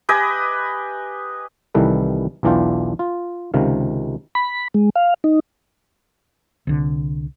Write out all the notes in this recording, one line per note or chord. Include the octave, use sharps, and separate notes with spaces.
G4 B4 D#5 G#5
C2 D#3 E3 G3 A4 B4
B1 E2 E3 D4 F4 G5
F4
C#2 C3 D#3 F5
B5
G#3
F5
D#4
C2 D3